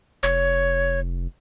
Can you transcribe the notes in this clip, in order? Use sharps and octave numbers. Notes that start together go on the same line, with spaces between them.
F1 C#5